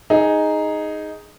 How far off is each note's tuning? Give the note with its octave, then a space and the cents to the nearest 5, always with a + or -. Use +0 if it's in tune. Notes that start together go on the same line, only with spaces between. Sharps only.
D#4 +0 G#4 +0